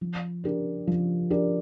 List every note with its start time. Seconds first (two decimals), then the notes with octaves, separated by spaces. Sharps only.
0.01 F3
0.44 D4 G4 A#4 D5
0.87 F3
1.30 D4 G4 A#4 D5